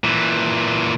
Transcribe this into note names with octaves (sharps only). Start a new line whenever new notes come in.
A#2 E3